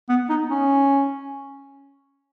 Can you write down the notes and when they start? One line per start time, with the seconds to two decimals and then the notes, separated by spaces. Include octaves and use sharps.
0.09 B3
0.29 D#4
0.49 C#4